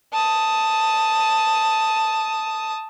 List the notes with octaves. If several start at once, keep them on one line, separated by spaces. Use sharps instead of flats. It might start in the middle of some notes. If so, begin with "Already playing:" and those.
A5 D#6